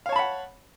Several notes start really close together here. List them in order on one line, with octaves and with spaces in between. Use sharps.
F5 C#5 A5 B5 F#5